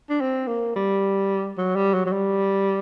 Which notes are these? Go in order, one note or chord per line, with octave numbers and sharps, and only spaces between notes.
D4
C4
A#3
G3
F#3
G3
F#3
F#3
G3